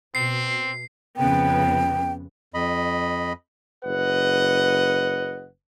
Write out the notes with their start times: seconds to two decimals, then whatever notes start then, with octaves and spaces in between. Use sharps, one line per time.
0.15 B2 C4 C7
1.17 F2 C#3 B3 G5
2.54 F2 D#5 B5
3.84 F#1 B4 D#5 F#5